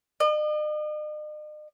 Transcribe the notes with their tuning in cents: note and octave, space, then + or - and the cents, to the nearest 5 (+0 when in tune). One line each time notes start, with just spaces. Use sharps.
D#5 -45